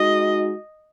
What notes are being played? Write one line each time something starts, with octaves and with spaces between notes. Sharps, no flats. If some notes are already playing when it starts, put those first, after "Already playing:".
Already playing: G#3 D#4 F#4 D#5